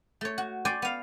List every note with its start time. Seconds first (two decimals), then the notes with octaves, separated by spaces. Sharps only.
0.21 A3 C#5
0.38 F#4
0.65 D5 G5 G#5 C6
0.82 B3 F5